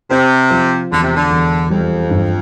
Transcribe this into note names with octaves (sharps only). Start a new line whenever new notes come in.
C3 C4
F3
E1 D3
C3
D3
E1
F2 G3
G2